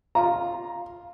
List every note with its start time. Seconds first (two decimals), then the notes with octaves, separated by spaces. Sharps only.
0.15 F4 A#5